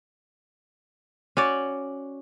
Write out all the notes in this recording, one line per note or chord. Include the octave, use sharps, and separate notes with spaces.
C#4 F#4 D5